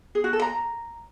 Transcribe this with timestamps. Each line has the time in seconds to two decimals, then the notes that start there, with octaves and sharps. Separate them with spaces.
0.15 G#4
0.24 F#4
0.33 A4
0.42 A#5